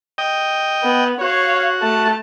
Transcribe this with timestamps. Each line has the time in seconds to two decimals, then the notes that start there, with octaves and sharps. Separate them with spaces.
0.18 D#5 G5
0.84 B3
1.21 F#4 C#5 F5
1.81 A3 A5